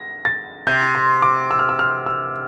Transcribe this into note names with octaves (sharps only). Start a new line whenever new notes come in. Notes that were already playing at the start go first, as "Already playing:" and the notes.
Already playing: A#6
A6
C3 G6
C6
D6
E6
F6
E6
F6
E6